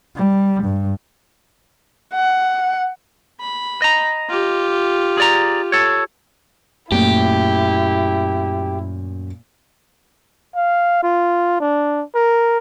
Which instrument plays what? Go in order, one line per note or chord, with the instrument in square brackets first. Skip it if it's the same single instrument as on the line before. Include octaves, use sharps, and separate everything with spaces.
[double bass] G3
G2
[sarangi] F#5
[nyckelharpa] B5
[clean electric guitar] D#5 A#5
[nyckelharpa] F4 G4
[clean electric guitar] G#4 D5 A#5
A4 C#5
[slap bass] F#2 [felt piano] A#2 A3 [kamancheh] E4 [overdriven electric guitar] G4
[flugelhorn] F5
F4
D4
A#4